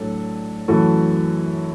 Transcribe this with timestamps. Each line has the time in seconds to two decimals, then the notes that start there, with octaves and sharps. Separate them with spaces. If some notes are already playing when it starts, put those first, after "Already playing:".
Already playing: A2 F#3 D4 A4
0.68 F#2 E3 A3 F#4 A4